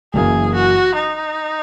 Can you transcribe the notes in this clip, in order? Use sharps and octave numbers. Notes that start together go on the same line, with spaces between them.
F#1 F#2 E3 A#3 G#4
F#4
D#4